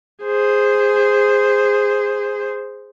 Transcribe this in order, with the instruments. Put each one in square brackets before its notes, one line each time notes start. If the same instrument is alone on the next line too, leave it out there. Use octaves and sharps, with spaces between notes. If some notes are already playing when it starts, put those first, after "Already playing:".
[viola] G#4 C5